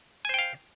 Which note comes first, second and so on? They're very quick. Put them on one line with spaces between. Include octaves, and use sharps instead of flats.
G#5 C5 G5 F5